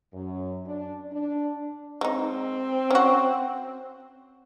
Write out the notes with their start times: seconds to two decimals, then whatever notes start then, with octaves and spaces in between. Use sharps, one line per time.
0.14 F#2
0.67 D4
1.12 D4
2.01 G#3 C4 D#4
2.91 C#4 F#4